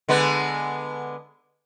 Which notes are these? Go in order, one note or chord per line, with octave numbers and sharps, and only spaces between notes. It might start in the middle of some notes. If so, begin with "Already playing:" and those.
D3 G#3 B3